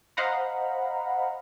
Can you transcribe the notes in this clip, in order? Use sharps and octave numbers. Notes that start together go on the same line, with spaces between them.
C5 D#5 F5 F#5 A#5 B5